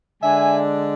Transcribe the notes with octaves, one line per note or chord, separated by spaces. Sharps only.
D3 G#3 D4 E5 G#5